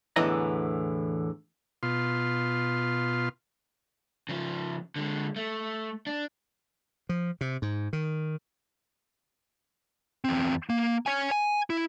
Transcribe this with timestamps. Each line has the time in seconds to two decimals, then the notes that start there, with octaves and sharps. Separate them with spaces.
0.16 E2 A2 D3 E3 D#5 A#5
1.83 B2 F4 C6
4.29 C#3 F3
4.96 D3 G#3
5.36 A3
6.07 D4
7.09 F3
7.41 C3
7.62 G#2
7.93 D#3
10.24 E2 C4
10.70 A#3
11.06 C#5 G#5
11.31 G#5
11.70 E4